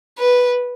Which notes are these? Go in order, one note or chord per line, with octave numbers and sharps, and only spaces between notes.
B4